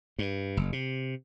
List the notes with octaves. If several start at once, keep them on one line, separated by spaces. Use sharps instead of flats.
G2
F#1
C3